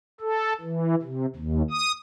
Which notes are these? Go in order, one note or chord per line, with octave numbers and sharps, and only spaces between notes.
A4
E3
C3
D#2
D#6